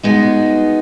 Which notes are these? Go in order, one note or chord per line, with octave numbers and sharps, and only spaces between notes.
G#3 B3 D#4 F#4